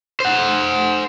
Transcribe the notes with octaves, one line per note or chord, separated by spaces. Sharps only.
C5 F#5